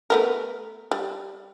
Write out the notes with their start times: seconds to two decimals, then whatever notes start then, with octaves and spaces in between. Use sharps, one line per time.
0.10 A3 B3 A#4
0.91 G3